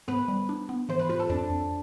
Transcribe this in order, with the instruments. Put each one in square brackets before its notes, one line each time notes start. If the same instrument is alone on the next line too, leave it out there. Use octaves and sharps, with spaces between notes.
[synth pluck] B3 [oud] B4
[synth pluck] G3
D4
B3
[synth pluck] E3 [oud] C5
[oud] B4
[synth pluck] F4 [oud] B4
[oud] A4
[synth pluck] F2 [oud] D4
[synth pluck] F2